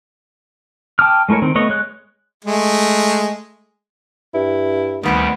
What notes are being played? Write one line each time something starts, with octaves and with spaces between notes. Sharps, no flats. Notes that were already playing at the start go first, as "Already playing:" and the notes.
G5 A5 D6 D#6 F6
G#3 A3 E4 A#4 C#5
D#3 C4
A3 B3 C#5 D#5
G#3 C#5 F#6
G#3 A3
G2 E4
D2 D#3 G3 B3 C4